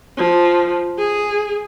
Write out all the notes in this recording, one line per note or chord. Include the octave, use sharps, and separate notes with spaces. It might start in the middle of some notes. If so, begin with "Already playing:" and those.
F3
G#4